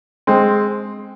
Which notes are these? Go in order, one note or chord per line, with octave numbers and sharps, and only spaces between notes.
G#3 C4